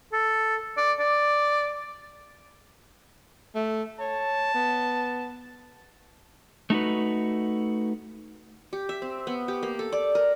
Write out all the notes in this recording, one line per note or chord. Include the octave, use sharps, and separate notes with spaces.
A4
D5
D5
A3
C#5 A5
B3
A3 D#4 F#4 B4
G4
E5
C4
B3
G4
A#3
A4
D5
A#4